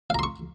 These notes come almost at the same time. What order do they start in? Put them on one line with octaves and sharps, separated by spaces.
F5 A#5 C6 C#6